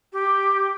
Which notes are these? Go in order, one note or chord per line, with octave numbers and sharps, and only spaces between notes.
G4